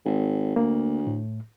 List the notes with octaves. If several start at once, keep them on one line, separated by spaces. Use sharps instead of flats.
G#1
D2 A#3
A2